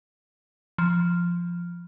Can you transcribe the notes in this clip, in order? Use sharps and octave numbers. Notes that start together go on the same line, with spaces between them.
F3